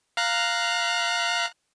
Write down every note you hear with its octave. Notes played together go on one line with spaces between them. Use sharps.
F5 A#5 F#6